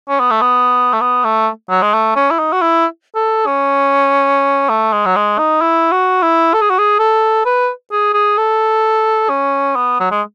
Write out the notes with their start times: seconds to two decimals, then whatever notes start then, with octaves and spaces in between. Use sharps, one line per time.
0.09 C#4
0.20 B3
0.31 A3
0.41 B3
0.93 A3
1.01 B3
1.24 A3
1.70 F#3
1.82 G#3
1.94 A3
2.16 C#4
2.31 E4
2.39 D#4
2.53 F#4
2.62 E4
3.15 A4
3.46 C#4
4.69 A3
4.93 G#3
5.05 F#3
5.16 G#3
5.38 D#4
5.61 E4
5.92 F#4
6.22 E4
6.53 A4
6.62 G#4
6.70 F#4
6.78 G#4
6.99 A4
7.45 B4
7.92 G#4
8.14 G#4
8.38 A4
9.29 C#4
9.76 B3
10.00 F#3
10.11 G#3